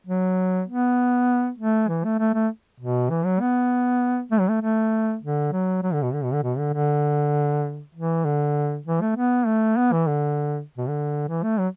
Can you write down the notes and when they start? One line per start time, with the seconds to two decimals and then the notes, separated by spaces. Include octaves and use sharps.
0.07 F#3
0.68 B3
1.58 A3
1.88 E3
2.04 A3
2.19 A3
2.34 A3
2.80 B2
3.10 E3
3.25 F#3
3.40 B3
4.31 A3
4.39 F#3
4.49 A3
4.62 A3
5.22 D3
5.52 F#3
5.83 F#3
5.93 D3
6.03 B2
6.13 D3
6.24 B2
6.33 D3
6.43 B2
6.58 D3
6.73 D3
7.95 E3
8.25 D3
8.86 E3
9.01 A3
9.16 B3
9.46 A3
9.77 B3
9.92 E3
10.07 D3
10.78 B2
10.88 D3
11.28 E3
11.43 A3
11.59 F#3